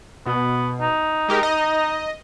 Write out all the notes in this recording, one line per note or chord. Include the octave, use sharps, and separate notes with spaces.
B2 B3
D#4
G#3 G4 A#4
D#5